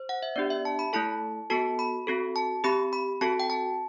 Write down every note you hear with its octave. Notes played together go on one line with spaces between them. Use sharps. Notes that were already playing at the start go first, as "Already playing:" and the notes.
Already playing: C5
F#5
E5
B3 D4 G4 D5
E5
A5
B5
A3 E4 A4 A5
B3 F#4 A4 A5
B5
C4 F#4 A4
A5
C4 G4 B5
B5
C4 F#4 A4 A5
G5
A5